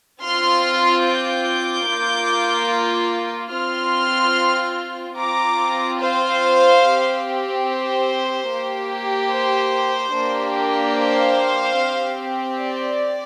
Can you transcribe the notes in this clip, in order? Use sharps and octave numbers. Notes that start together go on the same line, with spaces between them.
C4 F4 C6 F6
D6 G6
A#3 F4
C4 F4 C6 F6
C4 F4 A#5 D6
C5 F5
C4 G4
C5
A#3 G4
C5
A#3 D4 G4
C5 F5
C4 G4
D5